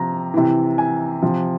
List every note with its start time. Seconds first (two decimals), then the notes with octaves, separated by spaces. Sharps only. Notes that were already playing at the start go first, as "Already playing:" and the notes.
Already playing: C3 F3 A#5
0.34 C3 E3
0.78 G#5
1.22 C3 F3